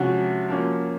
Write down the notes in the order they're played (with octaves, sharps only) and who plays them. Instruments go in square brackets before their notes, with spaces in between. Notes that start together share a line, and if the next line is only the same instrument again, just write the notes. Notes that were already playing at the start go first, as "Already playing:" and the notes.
Already playing: [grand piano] C3 F3 G#3 C#4 [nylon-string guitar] F#4
[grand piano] F3 A#3 C#4